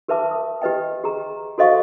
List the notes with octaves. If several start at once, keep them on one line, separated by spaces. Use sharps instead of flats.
G4 A#4 B4 E5 A5 D6
D#6
G4 B4 D#5 G5
G4 G#4 A#5
F#4 A4 C5 D#5 F5 C#6